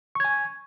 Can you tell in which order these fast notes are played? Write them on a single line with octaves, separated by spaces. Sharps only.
C#6 G#6 G#5